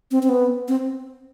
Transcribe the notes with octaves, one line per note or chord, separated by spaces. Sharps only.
C4
C4
B3
C4